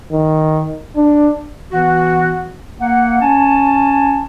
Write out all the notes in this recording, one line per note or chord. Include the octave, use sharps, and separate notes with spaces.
D#3
D4
E3 B3 F#4
A#3 F#5
C#4 G#5 A5